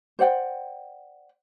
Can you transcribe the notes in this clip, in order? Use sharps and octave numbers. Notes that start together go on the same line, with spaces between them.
C5 D5 F#5 G5